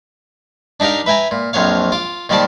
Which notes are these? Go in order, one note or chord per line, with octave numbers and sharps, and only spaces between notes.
D4 D#4 G4 A#4 F5
B4 E5 G5 G#5 A#5
A#2
A#1 F2 F#3 C#5 F5
F4 D6
A#2 D#3 G3 C5 D5 A5